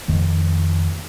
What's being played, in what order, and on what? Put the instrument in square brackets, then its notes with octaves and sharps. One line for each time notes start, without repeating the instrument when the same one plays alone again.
[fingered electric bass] F2 D#3 A3